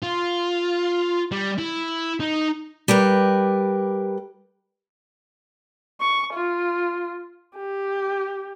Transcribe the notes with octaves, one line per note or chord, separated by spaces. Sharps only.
F4
G3
E4
D#4
G3 G4 A#4 B4
C#6
F4
G4